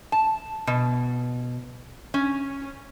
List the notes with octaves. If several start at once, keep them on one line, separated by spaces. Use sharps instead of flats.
A5
B2
C#4